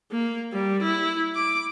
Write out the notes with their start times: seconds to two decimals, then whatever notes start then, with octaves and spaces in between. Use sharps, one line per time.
0.11 A#3
0.52 G3
0.82 E4
1.35 D6